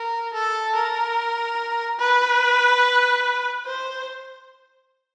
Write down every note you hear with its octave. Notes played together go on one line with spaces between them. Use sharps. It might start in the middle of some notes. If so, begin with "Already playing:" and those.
Already playing: A#4
A4
A#4
B4
C5